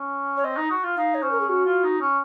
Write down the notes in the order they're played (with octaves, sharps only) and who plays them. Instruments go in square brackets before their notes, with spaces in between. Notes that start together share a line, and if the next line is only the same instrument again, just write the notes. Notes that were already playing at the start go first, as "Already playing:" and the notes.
Already playing: [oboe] C#4
[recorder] C#5
[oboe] C4 [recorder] D#5
[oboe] D#4
F#4
F4
[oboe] D#4 [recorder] F5
[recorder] C#5
[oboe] C#4 [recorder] C5
[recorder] A#4
G#4
[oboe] C#4 [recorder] F#4
[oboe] F4
D#4
C#4